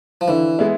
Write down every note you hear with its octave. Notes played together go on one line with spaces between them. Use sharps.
F3
D3 E3
G#3 B3 E4